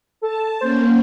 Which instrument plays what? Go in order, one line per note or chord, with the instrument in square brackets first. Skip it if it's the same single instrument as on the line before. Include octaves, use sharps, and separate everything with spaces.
[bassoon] A4 [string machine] A5
[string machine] A#3 C#4 [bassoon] C5